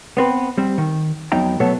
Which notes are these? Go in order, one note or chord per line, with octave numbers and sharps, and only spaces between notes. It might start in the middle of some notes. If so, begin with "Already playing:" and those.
B3 C4 B4
G3 C4
D#3
F2 F#3 B3 D#4 G5 A#5
B2 F#3 A3 B3 A4 C#5